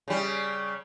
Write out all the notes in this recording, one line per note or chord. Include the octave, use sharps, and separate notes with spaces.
C#3 G3